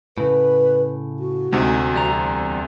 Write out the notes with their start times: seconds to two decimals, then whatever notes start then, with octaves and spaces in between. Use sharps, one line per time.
0.18 A2 C#3 B4
1.20 F#4
1.53 D2 C3 G#3 D#4 F#5
1.93 E2 G3 A#5